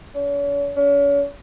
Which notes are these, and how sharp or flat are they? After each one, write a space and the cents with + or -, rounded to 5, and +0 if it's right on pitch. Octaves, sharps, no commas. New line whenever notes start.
C#4 +40
C#4 +35